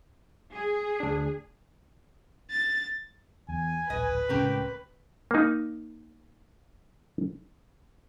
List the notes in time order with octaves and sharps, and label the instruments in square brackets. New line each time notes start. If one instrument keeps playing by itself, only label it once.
[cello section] G#4
[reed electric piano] D2 D4
[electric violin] A6
[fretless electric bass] E2 [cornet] G#5
[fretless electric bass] D1 A#1 [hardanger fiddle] B4 [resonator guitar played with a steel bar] D#5
[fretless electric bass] C#2 A2 C#3 [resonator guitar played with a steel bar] C4 C#4 A#4 [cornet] G4
[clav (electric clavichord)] A#3 D#4